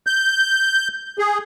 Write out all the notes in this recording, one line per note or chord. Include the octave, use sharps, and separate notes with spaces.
G6
G#4